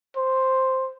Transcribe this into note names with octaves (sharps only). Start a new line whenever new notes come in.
C5